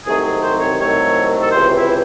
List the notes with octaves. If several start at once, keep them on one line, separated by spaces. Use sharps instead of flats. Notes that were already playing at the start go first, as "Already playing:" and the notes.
C2 C3 D#3 F#3 A3 G#4
G#4
C5
C#5
C2 C3 D#3 F#3 A3 C#5
A4
C#2 C3 E3 C5
E4